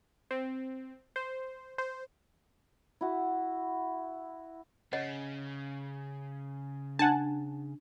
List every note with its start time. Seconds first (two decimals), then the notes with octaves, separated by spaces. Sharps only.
0.31 C4
1.16 C5
1.78 C5
3.01 E4 F#4
4.93 C#3 C#5 D#5 F#5
6.99 D4 F#5 G#5 A5